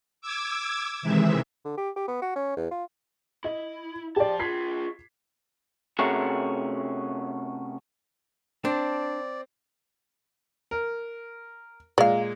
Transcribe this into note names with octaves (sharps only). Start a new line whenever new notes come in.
D6 E6 G#6
C3 D#3 E3 G#3 E5
D3
G4
G4
B3
F#4
C#4
E2
F4
E4 D#5
F3 G4 D5 A5
F4 G#4 G#6 B6 C7
C3 A3 C#4 F#4 G#4 A#4
C4 D4 D5
A#4
A#2 G#3 D5 F5